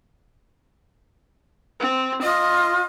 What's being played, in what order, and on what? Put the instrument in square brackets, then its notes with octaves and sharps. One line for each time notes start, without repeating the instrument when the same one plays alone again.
[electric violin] C4
[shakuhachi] F4 [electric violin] D#5